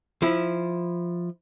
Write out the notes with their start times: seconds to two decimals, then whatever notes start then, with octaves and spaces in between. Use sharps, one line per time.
0.22 F3 E4